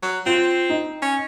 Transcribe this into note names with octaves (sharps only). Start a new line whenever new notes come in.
F#3
C4 F4
D#4
C#4